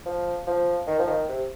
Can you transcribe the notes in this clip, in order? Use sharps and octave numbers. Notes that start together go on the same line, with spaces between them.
F3
F3
D#3
F3
D#3
C3